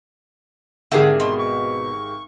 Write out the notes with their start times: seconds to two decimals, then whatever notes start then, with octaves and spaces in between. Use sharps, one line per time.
0.92 G#1 D3 C4 G4 G#4 A#4 E5
1.20 B2 C6
1.38 C#6